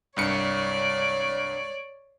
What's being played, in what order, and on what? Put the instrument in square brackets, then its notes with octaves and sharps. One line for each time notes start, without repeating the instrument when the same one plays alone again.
[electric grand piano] C2 G2 C#7 [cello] C#5 D5